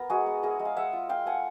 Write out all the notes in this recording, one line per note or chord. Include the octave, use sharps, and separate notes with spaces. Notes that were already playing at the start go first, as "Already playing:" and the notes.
Already playing: B3 A#4
G#3 F#4 G#4
B3
E4 G#4 A#4
G#3
F5
G#3 E5 F#5
F4
F4 F5 G5
A3 F#5 G#5